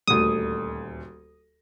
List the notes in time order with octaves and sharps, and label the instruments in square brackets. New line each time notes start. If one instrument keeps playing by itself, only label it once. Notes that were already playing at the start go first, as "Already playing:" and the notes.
[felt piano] D#1 D2 [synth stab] D#6